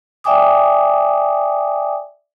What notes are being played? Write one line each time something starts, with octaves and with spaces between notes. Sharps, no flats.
D5 E5 G5 G#5 D6 D#6